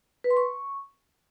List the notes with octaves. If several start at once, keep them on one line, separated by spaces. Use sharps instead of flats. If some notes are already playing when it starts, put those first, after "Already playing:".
B4
C6
C#6